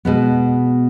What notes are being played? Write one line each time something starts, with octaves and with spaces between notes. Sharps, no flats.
B2 G#3 B3